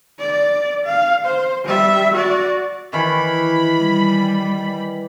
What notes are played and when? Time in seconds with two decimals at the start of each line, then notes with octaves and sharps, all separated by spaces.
0.19 D5
0.86 F5
1.26 C5
1.65 G3 E5
2.14 F#4 D5
2.93 D#3 E3 B5
3.78 G3